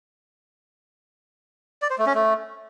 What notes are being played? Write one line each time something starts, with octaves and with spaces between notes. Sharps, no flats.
D5
C5
A3
C#4
A3